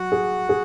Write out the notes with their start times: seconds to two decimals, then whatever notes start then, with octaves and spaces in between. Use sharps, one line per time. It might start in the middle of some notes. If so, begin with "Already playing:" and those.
Already playing: F#3 F#4 F#5
0.12 G#4
0.49 G#4